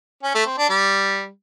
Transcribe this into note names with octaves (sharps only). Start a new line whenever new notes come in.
C#4
A3
C4
D4
G3